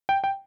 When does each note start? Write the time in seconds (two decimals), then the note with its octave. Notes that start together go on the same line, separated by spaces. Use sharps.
0.09 G5
0.24 G5